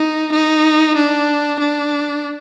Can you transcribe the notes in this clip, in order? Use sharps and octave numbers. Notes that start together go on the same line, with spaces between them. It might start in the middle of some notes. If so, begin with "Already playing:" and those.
Already playing: D#4
D#4
D4
D4